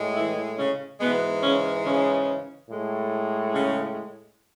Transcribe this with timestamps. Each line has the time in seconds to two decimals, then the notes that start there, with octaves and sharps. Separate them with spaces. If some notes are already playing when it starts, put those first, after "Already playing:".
Already playing: A2 G#3
0.16 E3 E4
0.58 C#3 C#4
1.00 G#2 B2 E3 G#3 B3
1.42 C#3 C#4
1.84 C#3 C#4
2.68 A2 G#3
3.53 C#3 C#4